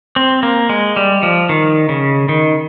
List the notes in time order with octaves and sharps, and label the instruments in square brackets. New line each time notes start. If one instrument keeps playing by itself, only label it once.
[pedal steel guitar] C4
A#3
G#3
G3
F3
D#3
C#3
D#3